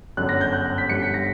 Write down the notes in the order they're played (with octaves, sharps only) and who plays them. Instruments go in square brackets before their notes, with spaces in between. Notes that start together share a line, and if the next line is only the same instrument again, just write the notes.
[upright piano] G1 F#2 D3 F#6
A#6
G6
F#6
G6
B6
G1 G2 D3 C#7
B6
A#6